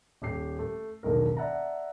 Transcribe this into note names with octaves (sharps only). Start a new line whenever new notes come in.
D#1 G4 C7
A3
E1 B1 D#3 A#4
D5 E5 F#5 A5 A#5